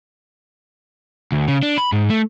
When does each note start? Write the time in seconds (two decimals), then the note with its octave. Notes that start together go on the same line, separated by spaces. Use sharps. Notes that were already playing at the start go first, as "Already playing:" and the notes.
1.32 D2
1.48 C#3
1.63 D4
1.78 B5
1.92 G#2
2.10 A3